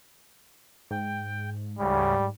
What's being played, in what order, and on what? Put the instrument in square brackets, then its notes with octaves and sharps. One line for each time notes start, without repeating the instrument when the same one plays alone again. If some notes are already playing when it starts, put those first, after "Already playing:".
[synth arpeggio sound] G#2 [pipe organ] G5
[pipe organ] D2 C#3 [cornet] G3